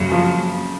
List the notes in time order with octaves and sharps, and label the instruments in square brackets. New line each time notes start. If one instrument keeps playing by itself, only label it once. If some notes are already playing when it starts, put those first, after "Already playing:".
Already playing: [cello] F#2 [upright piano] C#3
[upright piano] F3